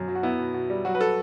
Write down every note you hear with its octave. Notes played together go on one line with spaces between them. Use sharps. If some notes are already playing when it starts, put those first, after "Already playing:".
Already playing: F#2 B2
F#3
F#4
B3 E4
B2
B2
G3
F#3 F#4
B4
A4